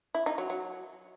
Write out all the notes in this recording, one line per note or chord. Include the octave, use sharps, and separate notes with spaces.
E4
D#4
F#3
F#3